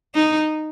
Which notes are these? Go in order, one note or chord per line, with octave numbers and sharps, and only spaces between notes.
D#4